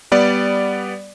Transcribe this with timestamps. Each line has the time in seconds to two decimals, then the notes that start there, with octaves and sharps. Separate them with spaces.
0.12 G3 B3 D5